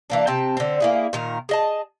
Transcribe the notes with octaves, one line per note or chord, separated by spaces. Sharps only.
E3 A#3 D4
C3 C4 G5 A5
D3 C4
A#3 E4 G#4
A#2 D#3 A#4
G#4 D#5 A5